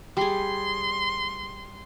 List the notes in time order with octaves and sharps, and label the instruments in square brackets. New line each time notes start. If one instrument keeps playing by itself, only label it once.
[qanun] G3 G#4 [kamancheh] C6